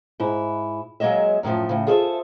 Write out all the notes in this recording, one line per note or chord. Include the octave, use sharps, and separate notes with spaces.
G#2 E4
F#3 G#3 A#3 C#5 D#5 E5
F#2 A2 D3 F3
A2 C#3
F4 G#4 A4 C5 D5 E5